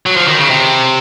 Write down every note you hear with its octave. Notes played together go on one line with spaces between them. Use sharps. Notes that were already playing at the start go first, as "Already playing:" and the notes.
F#3
F3
D#3
C#3
C3